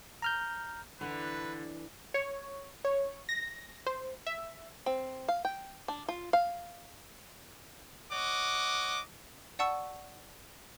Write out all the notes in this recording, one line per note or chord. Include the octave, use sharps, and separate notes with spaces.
A#5 F6 G6
D3 E3 B4
C#5
C#5
A#6
C5
E5
C4
F5
G5
D4
F4
F5
C#5 D#5 F#5 D6
D5 F#5 A5 C#6 E6